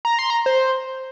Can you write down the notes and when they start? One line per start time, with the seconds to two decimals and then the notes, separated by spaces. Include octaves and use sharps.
0.05 A#5
0.19 C6
0.30 A#5
0.46 C5